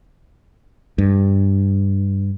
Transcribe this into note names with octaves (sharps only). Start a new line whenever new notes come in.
G2